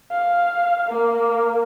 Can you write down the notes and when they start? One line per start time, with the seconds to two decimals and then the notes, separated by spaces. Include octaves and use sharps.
0.11 F5
0.89 A#3